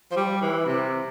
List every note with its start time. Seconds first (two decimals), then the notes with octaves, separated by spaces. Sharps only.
0.12 F3
0.16 G3
0.41 E3
0.66 C3